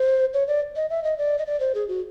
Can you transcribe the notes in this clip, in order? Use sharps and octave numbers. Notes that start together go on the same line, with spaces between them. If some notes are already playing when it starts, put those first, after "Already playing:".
Already playing: C5
C#5
D5
D#5
E5
D#5
D5
D#5
D5
C5
G#4
F#4